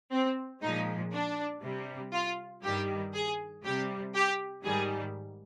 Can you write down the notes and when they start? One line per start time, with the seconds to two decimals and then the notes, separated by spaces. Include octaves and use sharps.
0.12 C4
0.63 A#2 F3 G#3 D#4
1.13 D4
1.63 C3 G3
2.13 F4
2.64 G2 D#3 G3 G4
3.14 G#4
3.65 C3 G3 G4
4.15 G4
4.65 G#2 D#3 G3 G#4